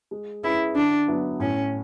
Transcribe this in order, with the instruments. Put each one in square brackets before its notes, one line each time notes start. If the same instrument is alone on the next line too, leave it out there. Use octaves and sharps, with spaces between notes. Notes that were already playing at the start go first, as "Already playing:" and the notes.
[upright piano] G#3
[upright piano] C#4 G#4 B4 [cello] E4
[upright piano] D3 [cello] D4
[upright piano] F#3 B3 E4 B4
[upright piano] A2 [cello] C#4